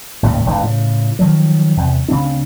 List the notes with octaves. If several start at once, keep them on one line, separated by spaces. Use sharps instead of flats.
G#1 D#2 A2 C#3
E1 C#2 G#2 D3
A2 C#3
D#3 F3 F#3
E2 C3
D2 C#3 C4 D4